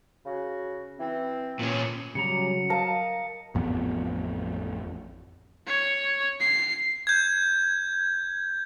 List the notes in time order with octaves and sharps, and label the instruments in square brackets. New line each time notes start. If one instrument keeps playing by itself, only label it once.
[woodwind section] C#3 F#4
E3 C4
[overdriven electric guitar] A#2 C#4
[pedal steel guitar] C#3 G3 A#5 [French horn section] F#3 [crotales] C#7
[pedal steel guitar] A#4 D#5 [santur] F5 A5 A#5
[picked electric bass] A1 F2 B3
[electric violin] C#5
C7
[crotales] G6 G#6